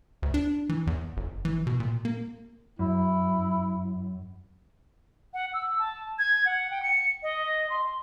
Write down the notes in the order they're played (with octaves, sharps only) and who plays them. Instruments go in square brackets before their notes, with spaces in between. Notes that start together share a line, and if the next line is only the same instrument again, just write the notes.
[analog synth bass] D2
D4
E3
E2
G1
E3
B2
A#2
A#3
[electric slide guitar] F#2 [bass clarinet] E4
[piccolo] F#5
E6
A5
G#6
F#5
G5
C#7
D#5
C6